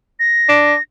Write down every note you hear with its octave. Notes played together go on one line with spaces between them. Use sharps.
A#6
D4